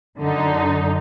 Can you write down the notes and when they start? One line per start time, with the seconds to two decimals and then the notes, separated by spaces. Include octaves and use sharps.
0.18 F#2 D3 D#4